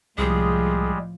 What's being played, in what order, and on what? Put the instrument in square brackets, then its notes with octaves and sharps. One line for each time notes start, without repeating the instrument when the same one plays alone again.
[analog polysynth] C2 [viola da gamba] A2 F3 [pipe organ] G3 G#3 [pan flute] G#4